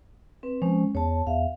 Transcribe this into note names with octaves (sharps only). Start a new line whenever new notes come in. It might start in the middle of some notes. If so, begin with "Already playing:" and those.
C4 B4
F3 G#3 C#4
E2 C#5 A5
E2 E5 F5